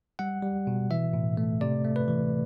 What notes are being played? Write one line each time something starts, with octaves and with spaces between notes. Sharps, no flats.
G3 F#5
G3
B2
E3 E5
A2
A3
C3 D5
A3
B4
E3